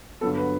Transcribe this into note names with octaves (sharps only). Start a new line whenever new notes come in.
G2 D3 F#3 B3 A4
B4